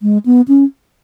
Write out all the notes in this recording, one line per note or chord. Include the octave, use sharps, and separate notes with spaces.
G#3
B3
C#4